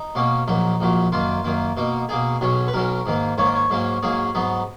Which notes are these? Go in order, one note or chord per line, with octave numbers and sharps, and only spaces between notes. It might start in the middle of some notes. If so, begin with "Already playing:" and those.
Already playing: D#4
B2 A#3 C#4
A#1 A#2 F#3 D#4
A#1 A#2 F#3
F#2 D#3 A#3 F4
F#2 D#3 A#3
B2 A#3 D#4
B2 A#3 D#4 G#4
B1 B2 F#3 C#4
B4
B1 B2 F#3 C#4 A#4
G#2 D#3 A#3
G#2 D#3 A#3 C#5
D#5
C#5
G#2 F#3 A#3 C#4
G#2 F#3 A#3 C#4 G#4
G#2 F#3 B3 D#4